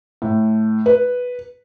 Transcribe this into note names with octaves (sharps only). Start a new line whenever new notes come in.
A2
B4